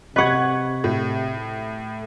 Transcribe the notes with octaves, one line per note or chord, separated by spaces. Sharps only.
C3 B4 D#5 F#5 C#6 F#6 G#6
A2